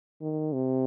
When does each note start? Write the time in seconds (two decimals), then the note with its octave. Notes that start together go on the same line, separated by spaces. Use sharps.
0.21 D#3
0.53 C3